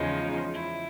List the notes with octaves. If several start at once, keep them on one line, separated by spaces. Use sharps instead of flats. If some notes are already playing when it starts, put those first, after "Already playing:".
Already playing: E2 C#3 F3 G#3 D#4
E4